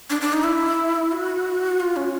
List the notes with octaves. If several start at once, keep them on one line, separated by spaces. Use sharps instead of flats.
D4
D4
D#4
E4
F#4
F4
C#4